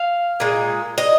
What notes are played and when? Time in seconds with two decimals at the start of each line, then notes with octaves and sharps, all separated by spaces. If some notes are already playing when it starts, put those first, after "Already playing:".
Already playing: F5
0.40 A#2 G#3
0.98 D#5